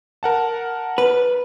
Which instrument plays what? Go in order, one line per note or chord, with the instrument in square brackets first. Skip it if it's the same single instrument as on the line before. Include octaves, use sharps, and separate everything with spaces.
[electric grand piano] A#4 F#5 A5
[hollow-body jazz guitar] B4